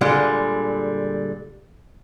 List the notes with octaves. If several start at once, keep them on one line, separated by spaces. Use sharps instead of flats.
A#2 D3 G3 G#3 F#5